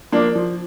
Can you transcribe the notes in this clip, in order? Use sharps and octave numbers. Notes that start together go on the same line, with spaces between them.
F3 A#3 D4
F3